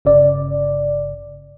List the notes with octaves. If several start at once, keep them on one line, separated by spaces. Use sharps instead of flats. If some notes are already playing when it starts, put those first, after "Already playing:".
G1 C#3 D5